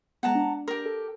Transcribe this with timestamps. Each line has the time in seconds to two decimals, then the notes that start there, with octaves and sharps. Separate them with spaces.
0.23 G#3 B3 F#5 A5 A#5
0.35 D4
0.68 G4 A#4
0.86 A4